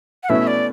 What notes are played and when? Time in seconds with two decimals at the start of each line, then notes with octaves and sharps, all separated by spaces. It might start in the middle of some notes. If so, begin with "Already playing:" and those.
0.23 F#5
0.29 B2 A3 C#4 E4 B4 E5
0.47 D5